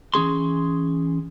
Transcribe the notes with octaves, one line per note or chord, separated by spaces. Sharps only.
E3 C#4 G#4 C6